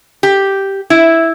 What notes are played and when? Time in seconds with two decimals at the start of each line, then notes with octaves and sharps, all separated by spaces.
0.23 G4
0.90 E4